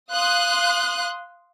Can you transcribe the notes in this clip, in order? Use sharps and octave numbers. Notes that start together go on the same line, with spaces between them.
F5 C6 D#6 F#6